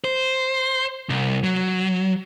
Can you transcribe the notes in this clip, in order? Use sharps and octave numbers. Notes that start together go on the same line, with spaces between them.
C5
C2
F#3